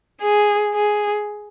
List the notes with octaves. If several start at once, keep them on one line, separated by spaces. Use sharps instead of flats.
G#4
G#4